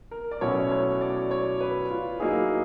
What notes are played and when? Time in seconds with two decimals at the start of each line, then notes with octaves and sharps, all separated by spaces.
0.11 A#4
0.31 D5
0.41 B2 F#3 A3 C#4 E4 C#5
0.71 C#5
1.01 D5
1.31 C#5
1.60 B4
1.90 F4
2.20 F#3 A#3 D#4 E4 G#4